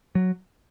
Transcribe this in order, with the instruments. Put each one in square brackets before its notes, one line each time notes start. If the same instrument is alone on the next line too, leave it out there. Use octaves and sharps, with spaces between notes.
[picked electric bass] F#3